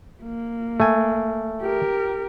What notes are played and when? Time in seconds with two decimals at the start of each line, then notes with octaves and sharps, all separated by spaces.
0.23 A#3
0.80 A3 G#5
1.61 G4 A#4